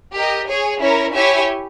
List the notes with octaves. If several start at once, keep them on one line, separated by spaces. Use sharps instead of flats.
G4 A#4 D#5
G#4 C#5 G#5
C#4 E4 A#4 C#5
E4 G4 C#5 E5 G#5